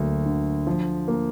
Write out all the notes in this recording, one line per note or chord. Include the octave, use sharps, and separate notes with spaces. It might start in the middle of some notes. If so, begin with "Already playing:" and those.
Already playing: D2 F#3 A#3
D3
F3
A#3